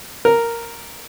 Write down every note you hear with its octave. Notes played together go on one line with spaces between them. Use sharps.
A#4